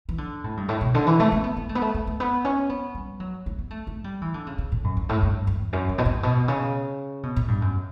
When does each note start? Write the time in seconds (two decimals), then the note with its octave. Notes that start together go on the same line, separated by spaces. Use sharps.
0.09 E3
0.18 D3
0.44 A2
0.57 G2
0.69 A2
0.81 B2
0.94 D3
1.07 E3
1.20 A3
1.32 C#4
1.44 B3
1.57 B3
1.69 A3
1.75 B3
1.81 A3
1.95 A3
2.07 A3
2.20 B3
2.45 C#4
2.70 B3
2.95 G3
3.20 F#3
3.46 A3
3.59 B3
3.71 A3
3.87 A3
4.04 G3
4.21 E3
4.34 D3
4.47 C#3
4.58 C#3
4.72 A2
4.84 F#2
4.97 G2
5.09 A2
5.22 G2
5.47 E2
5.73 F#2
5.89 G2
5.98 B2
6.06 A2
6.23 B2
6.48 C#3
7.23 B2
7.36 A2
7.48 G2
7.62 F#2